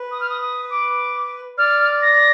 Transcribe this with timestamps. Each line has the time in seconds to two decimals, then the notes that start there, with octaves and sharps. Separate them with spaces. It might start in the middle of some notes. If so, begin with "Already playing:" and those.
Already playing: B4
0.11 D#6
0.20 F6
0.29 D#6
0.41 D#6
0.70 D6
1.58 D5 F6
2.02 A#6